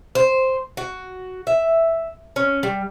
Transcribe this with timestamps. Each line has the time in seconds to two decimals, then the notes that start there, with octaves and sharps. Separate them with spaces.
0.15 C5
0.77 F#4
1.47 E5
2.36 C#4
2.63 G3